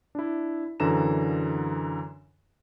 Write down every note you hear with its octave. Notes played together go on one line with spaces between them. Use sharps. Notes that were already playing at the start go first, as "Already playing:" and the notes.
D4 E4
F#2 D3 E3 A#5 E7